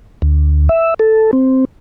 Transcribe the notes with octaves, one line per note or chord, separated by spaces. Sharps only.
D2
E5
A4
C4